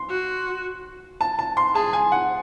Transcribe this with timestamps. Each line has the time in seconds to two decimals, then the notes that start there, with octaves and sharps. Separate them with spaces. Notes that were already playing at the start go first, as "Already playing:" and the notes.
Already playing: C6
0.10 F#4
1.21 A5
1.39 A5
1.57 C6
1.75 G#4 A5
1.93 G#5
2.12 F#5